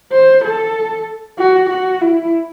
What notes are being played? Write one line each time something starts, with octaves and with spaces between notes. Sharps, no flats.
C5
A4
F#4
F#4
E4